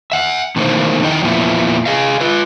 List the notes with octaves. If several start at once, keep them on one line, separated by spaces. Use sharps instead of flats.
E5 F#5
B2 D#3 E3 A3 A#3 C5
E2 D#3 E3 D#5 G5
E2 A#2 F3 A#3 B3 E4
G#4 D#5 F5
F4 B4